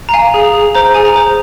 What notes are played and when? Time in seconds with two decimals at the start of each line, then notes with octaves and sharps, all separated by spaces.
0.09 A#5
0.14 F5 G#5
0.34 G#4
0.54 G#4
0.75 C5 A#5
0.94 G#4 G#5
1.05 A#5
1.16 C5